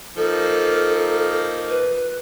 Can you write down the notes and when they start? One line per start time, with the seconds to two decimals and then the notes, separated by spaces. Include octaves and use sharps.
0.17 F3 A#3 D#4 A4
1.69 B4